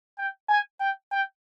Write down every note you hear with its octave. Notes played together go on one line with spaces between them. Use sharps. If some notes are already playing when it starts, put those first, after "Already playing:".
G5
G#5
G5
G5